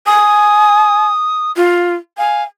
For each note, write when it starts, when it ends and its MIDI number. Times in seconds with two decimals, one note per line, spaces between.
0.06 1.08 80
0.06 1.51 87
1.56 1.94 65
2.18 2.44 77
2.18 2.42 80